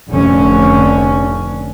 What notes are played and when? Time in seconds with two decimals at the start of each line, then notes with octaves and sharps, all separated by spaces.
0.12 F1 D3 C#4